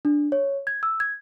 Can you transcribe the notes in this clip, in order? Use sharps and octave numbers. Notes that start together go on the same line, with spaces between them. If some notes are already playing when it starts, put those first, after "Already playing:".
D4
C#5
G#6
E6
G#6